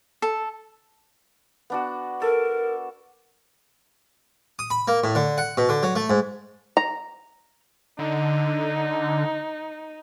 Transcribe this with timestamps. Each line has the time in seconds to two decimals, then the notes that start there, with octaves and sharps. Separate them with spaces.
0.22 A4
1.70 B3 D4 F#4
2.22 A4 A#4
4.59 D#6
4.70 B5
4.88 A#3
5.04 A2
5.15 D3
5.38 F#5
5.57 B2
5.69 D3
5.83 F#3
5.96 A3
6.10 G#2
6.77 A#5
7.99 D3 D#4